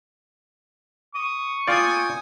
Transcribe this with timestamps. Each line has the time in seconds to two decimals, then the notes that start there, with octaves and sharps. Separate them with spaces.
1.15 C#6 D#6
1.68 F4 D5 G5 G#5 D#6